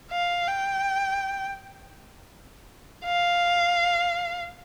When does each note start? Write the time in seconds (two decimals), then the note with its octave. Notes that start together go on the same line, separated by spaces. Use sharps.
0.11 F5
0.48 G5
3.05 F5